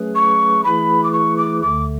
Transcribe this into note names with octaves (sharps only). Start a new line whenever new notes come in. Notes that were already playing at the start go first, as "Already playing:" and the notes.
Already playing: F#3 A3 C#4 G#4 B4
C#6
E3 A3 E4 G#4 B4 B5
D6
C#6
D6
D2 D3 A3 D6